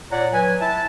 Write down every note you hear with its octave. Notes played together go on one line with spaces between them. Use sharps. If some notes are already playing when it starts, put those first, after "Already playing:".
A#2 C#5 D5 F#5 A#5
F#3 B4 G#5
E4 E5 A5